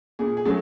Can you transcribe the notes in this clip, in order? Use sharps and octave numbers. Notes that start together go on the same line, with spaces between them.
A#2 G#4
G#4
F#3 A3